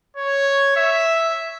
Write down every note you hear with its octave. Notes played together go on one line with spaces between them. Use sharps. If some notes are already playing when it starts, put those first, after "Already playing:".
C#5
E5